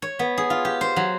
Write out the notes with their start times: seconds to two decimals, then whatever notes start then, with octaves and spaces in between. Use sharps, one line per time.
0.02 C#5
0.19 B3
0.38 G#4
0.50 F4
0.65 G4
0.81 C5
0.96 F#3